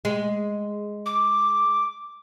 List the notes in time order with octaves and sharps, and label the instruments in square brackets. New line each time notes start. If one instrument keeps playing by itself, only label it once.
[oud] G#3
[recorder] D6